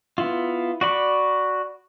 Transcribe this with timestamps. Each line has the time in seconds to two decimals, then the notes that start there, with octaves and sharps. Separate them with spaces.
0.18 B3 E4 F4
0.81 F#4 D5 B5 C#6